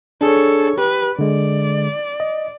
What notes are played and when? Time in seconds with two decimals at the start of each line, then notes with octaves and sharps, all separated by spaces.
0.21 D4 G#4 A4 C#5
0.78 G4 B4
1.19 D3 G#3 D5
2.20 D#5